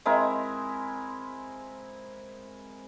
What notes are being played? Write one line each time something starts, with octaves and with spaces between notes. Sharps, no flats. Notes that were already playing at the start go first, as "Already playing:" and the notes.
G#3 C4 E4 A#4